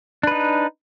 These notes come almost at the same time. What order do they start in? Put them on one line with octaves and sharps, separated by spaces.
D4 B4 D#4